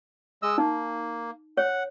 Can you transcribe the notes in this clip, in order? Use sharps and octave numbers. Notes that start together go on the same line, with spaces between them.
G#3 D#5 E6
A#3 D#4
C#5 F#5